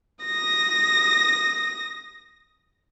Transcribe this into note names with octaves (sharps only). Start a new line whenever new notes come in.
D#6 A#6